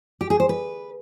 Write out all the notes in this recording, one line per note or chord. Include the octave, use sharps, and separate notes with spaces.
G4
G#4
C5
B4